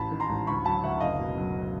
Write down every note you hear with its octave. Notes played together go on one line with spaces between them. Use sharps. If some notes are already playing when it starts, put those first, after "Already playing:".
Already playing: A1 A5 B5
D#3
A#5 C6
A1
D2 B5 C#6
F#3 A5 B5
D2 E5 F#5
F#1 D#5 F5
B2
F#3